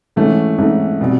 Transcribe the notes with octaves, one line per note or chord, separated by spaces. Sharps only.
G#2 E3 A3 C#4
G#2 E3 A3 C#4
B2 G3 C4